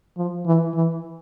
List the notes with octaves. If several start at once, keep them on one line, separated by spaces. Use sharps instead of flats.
F3
E3
E3